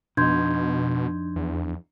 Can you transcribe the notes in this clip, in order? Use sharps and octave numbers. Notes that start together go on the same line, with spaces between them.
F2 B2 D4 D#4 C6 G6 G#6
E2